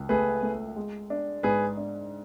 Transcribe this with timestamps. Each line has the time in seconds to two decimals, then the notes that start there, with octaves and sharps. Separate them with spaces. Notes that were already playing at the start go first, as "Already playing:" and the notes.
Already playing: C#2
0.09 A3 G#4 B4
0.43 A3
0.76 G#3
1.10 D4
1.43 G#2 G#4 B4
1.77 D4